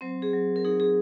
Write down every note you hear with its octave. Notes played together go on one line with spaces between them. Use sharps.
F#3 C4 C5
G#4
F#3
A#4
D#4 G#4
G#4